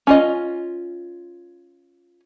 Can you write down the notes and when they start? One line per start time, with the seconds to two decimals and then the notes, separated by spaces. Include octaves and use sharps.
0.07 C#4 F4 D#5